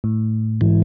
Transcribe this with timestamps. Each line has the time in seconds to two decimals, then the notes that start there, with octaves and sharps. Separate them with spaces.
0.04 A2
0.61 G#2 E3